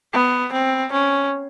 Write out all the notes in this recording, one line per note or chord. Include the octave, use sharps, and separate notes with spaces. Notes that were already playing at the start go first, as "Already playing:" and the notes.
B3
C4
C#4